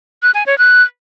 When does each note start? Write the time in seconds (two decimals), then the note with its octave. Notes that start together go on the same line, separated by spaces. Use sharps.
0.23 F#6
0.34 G#5
0.46 C#5
0.58 F#6